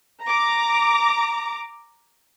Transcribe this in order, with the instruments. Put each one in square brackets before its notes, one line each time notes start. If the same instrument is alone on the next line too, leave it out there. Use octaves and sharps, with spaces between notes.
[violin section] A#5 D6